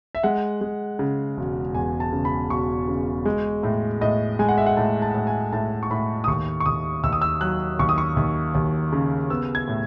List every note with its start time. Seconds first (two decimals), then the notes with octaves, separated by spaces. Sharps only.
0.15 E5
0.23 G#3 F#5
0.61 G#3
0.99 C#3
1.37 E1
1.75 E2 G#5
2.00 A5
2.13 C#3
2.25 B5
2.50 E1 C#6
2.88 C#3
3.25 G#3
3.63 A2
4.01 A2 D#5
4.39 G#3 G#5
4.49 F#5
4.58 E5
4.66 F#5
4.77 A2 A5
5.02 A5
5.15 A2
5.27 G#5
5.53 A2 A5
5.83 C#6
5.91 A2 B5
6.24 D#6
6.27 D#2 C#6
6.60 C#6
6.66 D#2 D#6
7.04 D#2 E6
7.13 D#6
7.22 E6
7.41 F#3 F#6
7.79 D#2 C#6
7.89 D#6
7.98 C#6
8.17 D#2
8.55 D#2
8.92 C#3
9.30 B3 E6
9.55 G#6
9.68 A2